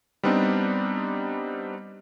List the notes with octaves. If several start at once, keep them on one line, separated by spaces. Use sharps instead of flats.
G3 B3 C4 D4 D#4